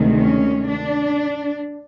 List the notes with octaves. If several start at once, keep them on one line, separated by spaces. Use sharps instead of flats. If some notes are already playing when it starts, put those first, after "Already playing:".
Already playing: D2 C3 D#3 G#3
C#4
D4